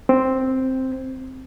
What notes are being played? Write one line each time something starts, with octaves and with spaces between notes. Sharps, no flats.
C4